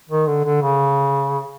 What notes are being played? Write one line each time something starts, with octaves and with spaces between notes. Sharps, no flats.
D#3
D3
D3
C#3